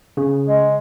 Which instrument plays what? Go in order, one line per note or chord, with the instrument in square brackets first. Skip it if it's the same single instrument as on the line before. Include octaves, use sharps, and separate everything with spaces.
[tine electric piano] C#3
[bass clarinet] G#3